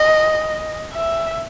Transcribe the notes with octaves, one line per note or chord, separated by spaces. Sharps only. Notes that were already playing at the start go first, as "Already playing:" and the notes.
Already playing: D#5
E5